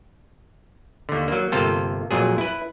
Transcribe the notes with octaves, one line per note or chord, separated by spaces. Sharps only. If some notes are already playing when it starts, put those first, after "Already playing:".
D#2 D3
F#3 A#3
G1 C3 A#3 F4 A4 G5
F2 A#2 F#3 G#4
E4 B4